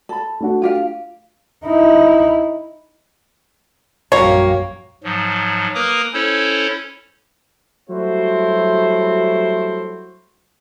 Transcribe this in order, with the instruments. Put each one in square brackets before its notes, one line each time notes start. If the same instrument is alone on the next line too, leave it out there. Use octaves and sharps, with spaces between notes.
[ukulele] A4 B5
[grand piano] A3 D4 F#4
[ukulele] F4 G4 F5
[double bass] D#4 E4
[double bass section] A#1 F#2 F#3 [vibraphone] G3 F#4 C#6 [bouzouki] A#3 [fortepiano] C#5
[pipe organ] G#2 F3 F#3
A#3 A#4 B4 A#5 D6 D#6
C#4 E4 A4 C5 C#5
[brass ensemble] F#3 G3 A3 E4 F#4 C5